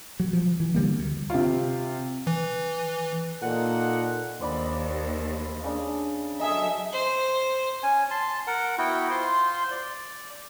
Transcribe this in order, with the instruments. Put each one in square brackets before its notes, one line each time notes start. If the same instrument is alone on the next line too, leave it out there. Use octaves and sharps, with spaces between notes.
[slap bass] F#3
F3
E3
D3 G3 A#3
D2
[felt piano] C3 F4
[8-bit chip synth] E3
[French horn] A#2 [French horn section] A#3 D#4 A4 [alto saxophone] F#5
[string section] D#2 [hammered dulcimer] C5 D5 B5
[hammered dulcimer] C#3 D4
[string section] F#3 E5 [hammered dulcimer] D#4 G#4 A4
[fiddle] C5
[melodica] C#4 G#5
A5 C6
A#4 F#5
B3 E4 F#4 G5
F4 C5 C6
D5